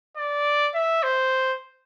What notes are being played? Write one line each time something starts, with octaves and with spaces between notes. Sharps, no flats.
D5
E5
C5